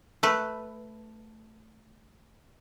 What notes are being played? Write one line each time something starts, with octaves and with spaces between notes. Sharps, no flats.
A3 B4